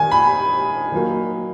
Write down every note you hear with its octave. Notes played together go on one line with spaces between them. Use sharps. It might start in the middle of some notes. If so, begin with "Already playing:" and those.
Already playing: D#3 A#3 G#5
B5
D#3 F#3 A#3